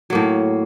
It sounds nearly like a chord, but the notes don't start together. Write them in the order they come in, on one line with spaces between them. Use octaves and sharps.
F#3 A#3 A2